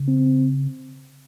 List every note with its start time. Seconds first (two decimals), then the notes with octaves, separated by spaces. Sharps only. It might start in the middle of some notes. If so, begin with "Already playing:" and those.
Already playing: C#3
0.08 C4